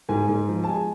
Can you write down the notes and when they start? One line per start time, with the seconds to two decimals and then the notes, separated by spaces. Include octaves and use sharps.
0.09 G#2 G#5
0.29 G#2
0.48 F3
0.64 A5
0.68 G#3 G#5